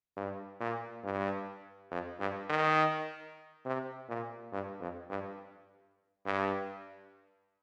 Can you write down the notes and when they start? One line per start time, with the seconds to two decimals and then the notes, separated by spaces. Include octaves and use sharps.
0.17 G2
0.60 A#2
1.04 G2
1.91 F2
2.20 G2
2.49 D#3
3.65 C3
4.09 A#2
4.52 G2
4.81 F2
5.10 G2
6.26 G2